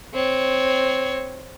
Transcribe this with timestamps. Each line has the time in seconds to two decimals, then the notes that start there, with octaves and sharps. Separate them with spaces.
0.13 C4 C#5